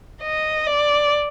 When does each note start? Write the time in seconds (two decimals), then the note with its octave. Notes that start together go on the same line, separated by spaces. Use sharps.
0.22 D#5
0.66 D5